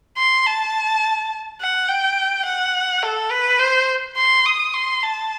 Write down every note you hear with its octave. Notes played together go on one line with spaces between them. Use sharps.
C6
A5
F#5
G5
F#5
A4
B4
C5
C6
D#6
C6
A5